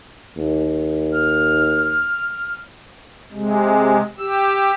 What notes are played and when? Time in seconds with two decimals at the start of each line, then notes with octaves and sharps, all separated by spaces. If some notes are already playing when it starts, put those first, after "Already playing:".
0.37 D#2
1.13 F6
3.32 C3 G#3
4.18 G4 E6